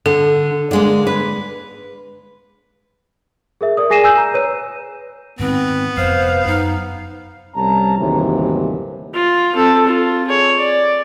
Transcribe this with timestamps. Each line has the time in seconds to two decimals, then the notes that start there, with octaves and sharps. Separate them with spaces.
0.06 D3 A4
0.71 D3 G#3 A#3
1.07 B4
3.61 G#4 A#4 E5
3.77 A#4 D5 D#6
3.90 G#4 G#5 A#6 C7 D#7 E7
4.04 G#5 E6 G6
4.18 A#5
4.34 B4 C#5 D#7
5.39 G#2 D#3 B3 C4
5.97 F1 F2 C5 F5
6.47 F#2 D#4
7.56 C2 G3 C#4 A5 A#5
7.98 G1 D#2 A2 C3 E3 F#3
9.14 F4
9.54 C4 A4
9.87 F4
10.28 G#4 C#5
10.59 D5